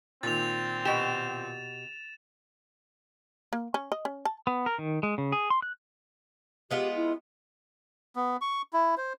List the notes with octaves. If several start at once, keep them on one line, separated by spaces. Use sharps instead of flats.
A#2 D#3 C4 A6 F7
B2 G4 E7
A#3
C#4
D#5
C#4
A5
B3
A#4
D#3
G#3
C#3
G#4
C6
F#6
G#3 B3 F4 G4
E4
B3
C#6
E4
C5